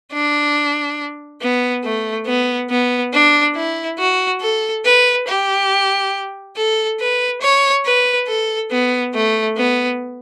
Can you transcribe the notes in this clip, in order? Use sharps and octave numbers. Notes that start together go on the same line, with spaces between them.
D4
B3
A3
B3
B3
D4
E4
F#4
A4
B4
G4
A4
B4
C#5
B4
A4
B3
A3
B3